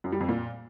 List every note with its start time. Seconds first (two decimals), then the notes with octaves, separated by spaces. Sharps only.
0.04 F#2
0.12 G3
0.21 F2
0.29 A#2